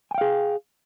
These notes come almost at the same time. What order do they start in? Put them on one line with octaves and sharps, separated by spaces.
G#5 G5 F5 G#4